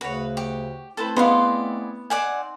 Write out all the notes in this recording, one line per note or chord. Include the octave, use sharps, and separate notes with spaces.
D2 C#3 F#4 B4 C#5
G4
A3 C4 E4 A4 B4 C5 A5
B3 G#4 D5 D#5 F5 F#5 C6
C4 D#4 D5 F#5 G#5